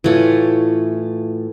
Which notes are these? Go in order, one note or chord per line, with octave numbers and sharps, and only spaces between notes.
A2 E3 A3 F4 C#5